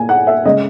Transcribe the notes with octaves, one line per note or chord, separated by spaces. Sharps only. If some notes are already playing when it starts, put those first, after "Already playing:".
Already playing: A#2 A#3 G#5
F#5
E5
C#3 G#3 D#5